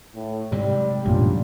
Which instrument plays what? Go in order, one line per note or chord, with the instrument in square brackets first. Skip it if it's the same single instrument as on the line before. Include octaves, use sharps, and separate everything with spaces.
[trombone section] A2
[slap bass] G#2 C3 F#3 [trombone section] G3
[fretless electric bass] A1 F#2 A#2 [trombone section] C#4 D4 F4